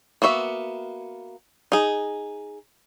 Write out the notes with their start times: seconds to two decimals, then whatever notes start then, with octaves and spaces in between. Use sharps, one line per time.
0.22 A#3 B3 F#4 E5
1.72 D#4 G#4